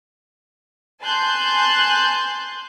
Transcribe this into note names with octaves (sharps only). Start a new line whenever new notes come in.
G#5 A5 C6 F#6 G6